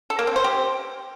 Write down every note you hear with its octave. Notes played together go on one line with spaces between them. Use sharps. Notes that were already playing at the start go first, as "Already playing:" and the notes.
A4
A#3
C4
C5
G4